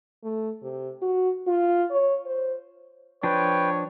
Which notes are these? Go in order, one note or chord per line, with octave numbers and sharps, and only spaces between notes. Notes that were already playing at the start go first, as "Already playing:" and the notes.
A3
C3
F#4
F4
C#5
C5
F3 D4 B4 C#5 G5